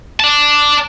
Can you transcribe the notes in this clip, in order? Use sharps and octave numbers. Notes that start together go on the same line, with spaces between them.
D5 A5